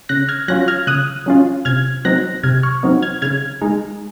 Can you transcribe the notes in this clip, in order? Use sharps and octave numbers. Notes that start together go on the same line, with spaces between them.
C#3 F#6 A#6
F6 G#6
F#3 C#4 F4 F#6 A#6
F6 G#6
C#3 D#6 F#6
F#3 C#4 F4
C3 F6 G#6
F#3 C4 D#4 F#6 A#6
C3 F6 G#6
C#6 F6
F#3 C4 D#4
F6 G#6
C#3 F6 G#6
G#3 D#4